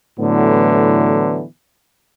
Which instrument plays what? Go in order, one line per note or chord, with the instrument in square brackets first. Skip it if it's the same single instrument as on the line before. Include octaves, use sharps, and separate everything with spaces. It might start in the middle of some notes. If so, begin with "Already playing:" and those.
[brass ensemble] A2 D3 E3 F#3 B3